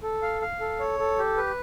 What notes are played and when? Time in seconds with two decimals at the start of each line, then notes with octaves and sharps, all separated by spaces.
0.03 A4
0.22 F5
0.42 F5
0.60 A4
0.80 C#5
0.99 A4
1.19 G4
1.37 B4